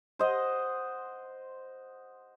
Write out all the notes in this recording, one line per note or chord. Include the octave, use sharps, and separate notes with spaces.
C5 D#5 F#5